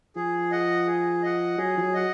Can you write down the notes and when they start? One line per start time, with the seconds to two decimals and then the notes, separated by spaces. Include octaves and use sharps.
0.16 F3 G#4
0.51 D#5 F#5
0.87 G#4
1.23 D#5 F#5
1.58 F#3 G#4
1.77 F3
1.82 F#3
1.94 D#5 F#5